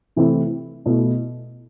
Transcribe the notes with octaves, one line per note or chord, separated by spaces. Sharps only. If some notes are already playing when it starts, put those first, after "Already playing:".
C3 E3 A3 C4 E4
B2 A3 E4